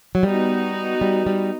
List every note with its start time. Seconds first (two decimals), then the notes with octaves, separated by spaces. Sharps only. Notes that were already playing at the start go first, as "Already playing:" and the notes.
0.15 F#3
0.23 G3 B3 D#4 F#4
1.01 G3
1.27 G3